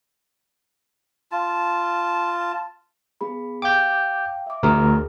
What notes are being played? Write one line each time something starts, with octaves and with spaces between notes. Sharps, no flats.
F4 A5
B3 G#4 B5
F5 G5 D6 G6
E5 D6
D2 G#4 A#4